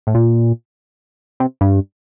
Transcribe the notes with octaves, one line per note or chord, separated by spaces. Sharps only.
A2
A#2
C3
G2